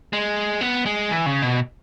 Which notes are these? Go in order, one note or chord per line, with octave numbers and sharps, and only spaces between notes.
G#3
B3
G#3
E3
C#3
B2